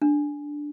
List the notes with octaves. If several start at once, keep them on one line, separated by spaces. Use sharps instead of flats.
D4